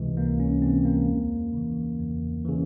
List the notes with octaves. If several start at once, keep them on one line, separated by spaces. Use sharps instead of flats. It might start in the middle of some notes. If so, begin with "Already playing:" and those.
Already playing: C#2 C3 E3 G#3
C#2 A#3
C#4
C3 E3 C4
A#3
E2
C#3 E3
E2
C#3 E3